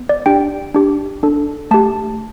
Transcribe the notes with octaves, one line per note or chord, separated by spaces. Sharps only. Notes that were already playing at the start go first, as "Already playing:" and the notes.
Already playing: B3
D5
D4 G4 G5
D4 G4
D4 A4
A3 G4 A5